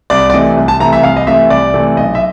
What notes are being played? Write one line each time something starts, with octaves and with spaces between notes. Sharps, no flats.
C2 D5
D5
C3 E3 A3 D#5
C2
A5
C3 E3 A3 A#5
E5
C2 F5
D#5
C3 E3 A3 E5
C2 D5
C3 E3 A3
B1 D#5
E5